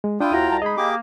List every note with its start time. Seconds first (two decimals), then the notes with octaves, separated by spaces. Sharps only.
0.04 G#3
0.20 D4 E4 F4 G5 D#6
0.33 D#2 E4 F#4 F#5 A#5
0.49 C2 A5 A#5
0.62 G#3 D#4 G#4 D#5 B5
0.77 A#3 G4 G#4 D6